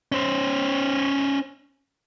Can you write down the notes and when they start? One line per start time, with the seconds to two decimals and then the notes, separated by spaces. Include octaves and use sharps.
0.12 C#4 C5